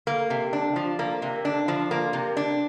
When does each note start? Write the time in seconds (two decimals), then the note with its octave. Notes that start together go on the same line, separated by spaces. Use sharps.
0.07 A#3
0.30 C3
0.53 D4
0.76 F3
0.99 A#3
1.22 C3
1.45 D4
1.68 F3
1.91 A#3
2.13 C3
2.37 D4